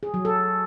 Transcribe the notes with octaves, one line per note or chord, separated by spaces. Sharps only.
G#4
F#3
A4